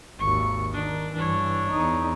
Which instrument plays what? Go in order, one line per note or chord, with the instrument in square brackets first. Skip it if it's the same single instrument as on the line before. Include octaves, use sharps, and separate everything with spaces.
[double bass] G#1 D#2 [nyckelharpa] C#6
[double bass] D#3 [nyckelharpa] D4
[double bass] G2 E3 [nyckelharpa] D4 C#5
[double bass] E2 D#4